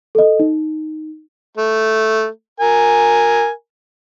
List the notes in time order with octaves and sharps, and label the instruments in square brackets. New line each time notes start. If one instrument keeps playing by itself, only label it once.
[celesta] A4 D#5
D#4
[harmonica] A3
A#4 G#5